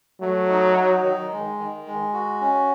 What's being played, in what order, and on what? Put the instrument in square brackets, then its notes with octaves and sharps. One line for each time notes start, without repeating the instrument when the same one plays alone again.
[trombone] F#3 [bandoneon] A3
[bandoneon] D#4
D#4
D#3
G#3
D#3
G#3
F#4
C#4